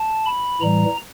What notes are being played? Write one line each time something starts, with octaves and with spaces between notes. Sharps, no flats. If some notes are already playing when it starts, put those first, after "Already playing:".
Already playing: A5
B5
A2 E3 G3 A#5